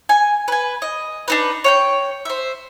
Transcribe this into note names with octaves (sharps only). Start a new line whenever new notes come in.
G#5
B4 G#5
D#5
D4 D#4 B4
C#5 F#5 G5
C5 E5